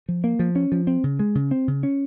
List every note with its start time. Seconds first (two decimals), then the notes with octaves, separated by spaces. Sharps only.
0.09 F3
0.24 A#3
0.39 F3
0.56 C#4
0.72 F3
0.87 C4
1.04 C#3
1.19 G#3
1.35 C#3
1.51 C4
1.68 C#3
1.83 C#4